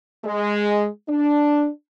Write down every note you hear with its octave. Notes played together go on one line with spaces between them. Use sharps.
G#3
D4